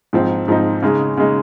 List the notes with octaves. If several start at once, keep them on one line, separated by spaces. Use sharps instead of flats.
G#2 F3 C4 D#4
G#2 F3 C4 D#4
C#3 G#3 D#4
C#3 G#3 D#4